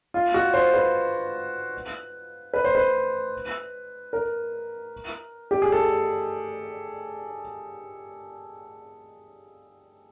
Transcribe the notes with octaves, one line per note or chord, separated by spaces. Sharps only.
F4
F#4
C5
B4
B4
C5
B4
A#4
G4
G#4
A4